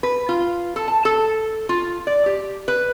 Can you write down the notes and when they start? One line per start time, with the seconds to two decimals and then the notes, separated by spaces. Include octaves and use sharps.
0.03 B4
0.29 F4
0.76 A4
0.88 A5
1.05 A4
1.69 F4
2.07 D5
2.26 G4
2.68 B4